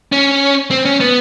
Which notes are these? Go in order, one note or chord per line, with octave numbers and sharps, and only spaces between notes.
C#4
C4
C#4
B3